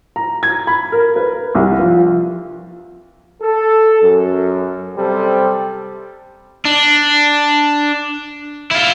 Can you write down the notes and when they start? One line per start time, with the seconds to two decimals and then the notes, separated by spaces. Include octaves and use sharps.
0.16 A#5
0.43 G#6
0.67 B5
0.92 A#4
1.16 B4
1.55 C2
1.79 F3
3.43 A4
4.03 F#2
4.97 C3 G3 A4 C5
6.65 D4
8.71 E4 F4